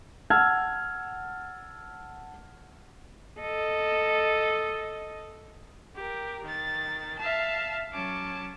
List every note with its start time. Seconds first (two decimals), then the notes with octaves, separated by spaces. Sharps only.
0.30 F#5 A5 E6 F6 G#6
3.40 A4 D#5
5.95 G4 A#4
6.43 D#3 A6
7.19 E5 F5 A5
7.93 F#3 C#4 A5 D6